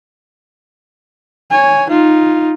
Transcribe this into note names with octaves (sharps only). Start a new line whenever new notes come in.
C#5 G#5
D#4 F4